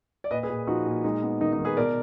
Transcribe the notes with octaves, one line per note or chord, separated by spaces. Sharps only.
D5
A#2 B4 D#5
G#4 B4
A#2
F3 D#4 F#4
A#2
G#3 D#4
B3
D#3 D#4
D#4
D#3
G#4 B4
B2 A#4 D5